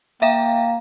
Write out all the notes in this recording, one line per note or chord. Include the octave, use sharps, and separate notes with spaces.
A#3 E5 F5 G5